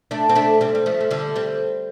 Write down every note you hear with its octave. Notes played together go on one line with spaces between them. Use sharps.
A3 D4
C4
A3 D4
G3 C4
G3
F3 A3
A3
D3 G3
G3 C4